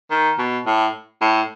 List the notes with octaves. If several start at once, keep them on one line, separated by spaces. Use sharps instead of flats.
D#3
B2
A2
A2